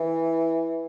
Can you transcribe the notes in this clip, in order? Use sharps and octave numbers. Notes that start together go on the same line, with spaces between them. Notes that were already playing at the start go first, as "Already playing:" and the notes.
Already playing: E3